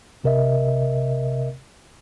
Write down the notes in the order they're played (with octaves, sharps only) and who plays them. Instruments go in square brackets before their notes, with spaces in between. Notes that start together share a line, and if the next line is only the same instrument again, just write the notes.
[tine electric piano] A1 C3 A#4 D#5 E5